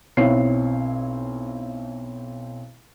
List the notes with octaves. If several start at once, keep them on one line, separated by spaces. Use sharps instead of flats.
B1 C4 E4 C#5 F5 C7